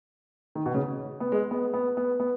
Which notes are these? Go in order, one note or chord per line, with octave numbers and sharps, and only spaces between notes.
D#3
B2
C#3
B3
G#3
B3
B3
B3
B3